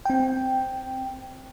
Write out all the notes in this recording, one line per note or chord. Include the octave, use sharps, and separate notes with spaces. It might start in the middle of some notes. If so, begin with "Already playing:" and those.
C4 G5